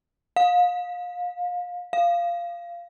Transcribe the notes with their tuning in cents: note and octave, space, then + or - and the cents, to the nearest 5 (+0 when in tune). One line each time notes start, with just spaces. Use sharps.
F5 +30
F5 -15